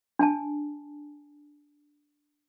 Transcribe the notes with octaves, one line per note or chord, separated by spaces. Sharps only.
D4 G#5 A5